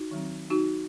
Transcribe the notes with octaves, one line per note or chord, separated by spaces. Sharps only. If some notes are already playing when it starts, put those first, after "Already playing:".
Already playing: D#4 F#4
D#3 F#3 C4
D#4 F#4